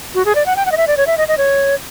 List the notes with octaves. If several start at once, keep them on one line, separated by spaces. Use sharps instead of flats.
F#4
G#4
D5
F#5
G5
F#5
D#5
E5
D5
C#5
E5
D#5
D#5
C#5